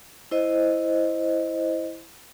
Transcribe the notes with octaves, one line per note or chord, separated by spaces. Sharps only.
E4 C5 D#5